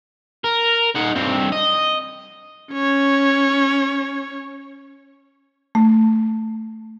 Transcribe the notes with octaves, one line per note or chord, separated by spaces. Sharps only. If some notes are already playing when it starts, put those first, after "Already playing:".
A#4
D#4 F#5
G2 C4
D#5
C#4 C#5
A3